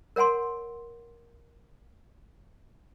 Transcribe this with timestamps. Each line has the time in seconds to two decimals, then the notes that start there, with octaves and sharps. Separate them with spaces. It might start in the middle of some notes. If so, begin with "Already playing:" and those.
0.16 A#4 C#5 F#5 G#5 C6